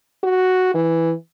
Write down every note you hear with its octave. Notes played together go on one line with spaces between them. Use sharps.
F#4
E3